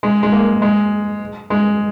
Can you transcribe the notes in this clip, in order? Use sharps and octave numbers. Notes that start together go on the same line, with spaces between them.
G#3
G#3
A#3
G#3
G#3